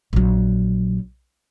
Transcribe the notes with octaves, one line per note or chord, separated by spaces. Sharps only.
A#1 F#3